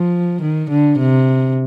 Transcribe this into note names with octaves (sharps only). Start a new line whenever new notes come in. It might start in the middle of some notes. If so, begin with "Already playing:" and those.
Already playing: F3
D#3
D3
C3